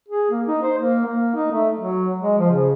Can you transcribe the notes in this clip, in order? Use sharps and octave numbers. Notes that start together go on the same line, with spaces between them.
G#4
A#3
D#4
C5
A#3
A#3
D#4
A3
F#3
G#3
F3
C#3